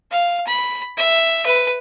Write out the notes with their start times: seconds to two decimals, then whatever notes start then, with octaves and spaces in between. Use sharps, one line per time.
0.11 F5
0.47 B5
0.97 E5
1.46 B4